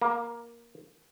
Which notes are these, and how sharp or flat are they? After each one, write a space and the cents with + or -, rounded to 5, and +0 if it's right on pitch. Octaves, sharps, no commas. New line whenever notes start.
A#3 +10